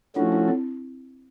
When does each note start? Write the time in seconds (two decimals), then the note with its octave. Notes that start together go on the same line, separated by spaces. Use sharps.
0.16 F3 A3 C#4 D4 E4 F#4
0.32 D4 E4
0.48 C4